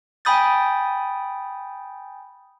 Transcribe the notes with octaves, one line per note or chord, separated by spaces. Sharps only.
G5 G#5 B5 D#6 G6 A6